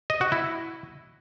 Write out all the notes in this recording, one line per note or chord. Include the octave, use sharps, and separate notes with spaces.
D#5
F#4
E4